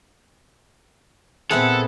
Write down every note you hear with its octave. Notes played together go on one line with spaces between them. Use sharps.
A#2 B3 C4 E4 G#4 A4 F#5